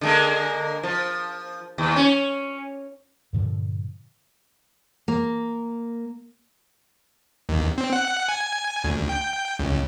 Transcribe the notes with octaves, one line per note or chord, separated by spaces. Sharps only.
D3 G#3 A#3
F3
D#2
C#4
G2 A#2 D3 F3
A#3
D#2
C4
F#5
G#5
D2
G5
C#2